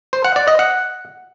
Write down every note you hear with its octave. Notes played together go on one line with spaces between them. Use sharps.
C5
F#5
D5
D#5
F#5